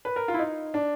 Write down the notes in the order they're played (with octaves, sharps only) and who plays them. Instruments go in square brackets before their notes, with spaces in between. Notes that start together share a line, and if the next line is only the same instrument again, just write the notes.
[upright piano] B4
A#4
F4
E4
D#4
D4